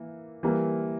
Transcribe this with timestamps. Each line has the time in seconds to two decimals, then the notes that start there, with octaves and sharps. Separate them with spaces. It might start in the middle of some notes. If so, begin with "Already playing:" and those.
Already playing: E3 A#3
0.43 E3 G3 A#3